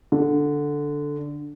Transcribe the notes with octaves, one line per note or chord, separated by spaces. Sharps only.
D3